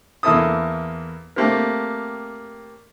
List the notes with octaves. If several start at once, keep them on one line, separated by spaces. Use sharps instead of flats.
E2 A#3 E4 A4 D#6
A3 A#3 C4 G4 A#4